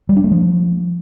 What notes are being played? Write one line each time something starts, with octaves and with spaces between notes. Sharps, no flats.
G3
D4
A3
F3